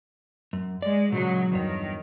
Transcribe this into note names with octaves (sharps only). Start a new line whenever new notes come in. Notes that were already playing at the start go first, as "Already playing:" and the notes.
F#2
G#3 D5
A#2 C#3 F#3 G#3
E2 G2 D#3 C#5